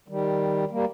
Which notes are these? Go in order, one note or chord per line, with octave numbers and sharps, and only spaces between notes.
D#3 G3
G3 A#3